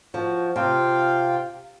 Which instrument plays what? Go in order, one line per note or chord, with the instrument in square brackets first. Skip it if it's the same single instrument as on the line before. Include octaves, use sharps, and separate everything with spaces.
[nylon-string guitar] F3 [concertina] F#4
[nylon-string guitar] C3 [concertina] F4 F5 G5